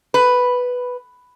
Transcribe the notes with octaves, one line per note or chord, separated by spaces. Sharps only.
B4